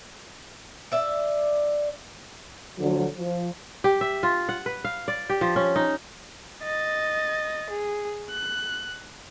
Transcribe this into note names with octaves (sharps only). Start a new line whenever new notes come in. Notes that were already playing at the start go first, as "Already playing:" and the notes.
D5 E5
D2 D3 F3 F#3
F3
G4
E5
F4
F#5
B4
F5
D5
G4
F3
C#4
D#4
D#5 A6
G#4
F#6